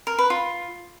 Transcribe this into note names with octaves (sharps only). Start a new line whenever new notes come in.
A#4
B4
F4